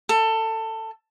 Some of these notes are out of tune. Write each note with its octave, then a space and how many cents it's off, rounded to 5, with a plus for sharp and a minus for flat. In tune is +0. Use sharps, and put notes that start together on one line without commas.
A4 +20